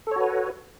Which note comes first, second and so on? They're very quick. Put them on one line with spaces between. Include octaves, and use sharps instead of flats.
A4 C#5 F#4 B4